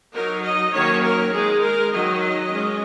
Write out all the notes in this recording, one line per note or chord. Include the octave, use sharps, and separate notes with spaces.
F#3 D#4 A#4
D#5
D#3 F#3 A#3 C#4 C#5
A#4
G#3 D#4 G#4
A#4
D#3 F#3 D#4 D#5
G#3 C#4